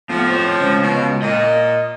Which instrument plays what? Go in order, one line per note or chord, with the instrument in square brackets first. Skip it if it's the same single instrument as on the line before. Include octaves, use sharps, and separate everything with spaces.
[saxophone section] F2 A2 F3 [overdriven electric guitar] B3
[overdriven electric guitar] C5 C#5
C#2 C#4
[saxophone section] B2
[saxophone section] A#2 [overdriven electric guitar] D#5